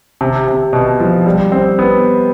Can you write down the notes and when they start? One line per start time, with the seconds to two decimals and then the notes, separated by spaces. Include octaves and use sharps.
0.21 C3
0.48 C3
0.73 B2
1.00 F3
1.26 G3
1.52 C4
1.79 B3